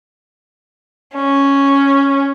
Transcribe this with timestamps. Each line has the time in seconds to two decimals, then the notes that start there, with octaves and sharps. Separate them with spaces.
1.15 C#4